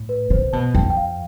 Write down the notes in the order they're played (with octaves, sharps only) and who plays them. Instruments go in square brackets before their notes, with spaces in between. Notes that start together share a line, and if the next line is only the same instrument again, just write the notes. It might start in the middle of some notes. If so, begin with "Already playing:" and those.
Already playing: [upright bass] A2
[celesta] B4
[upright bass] C3 [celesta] C5
[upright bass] B2 [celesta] A5
[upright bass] F2 [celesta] G5
[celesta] G5
F5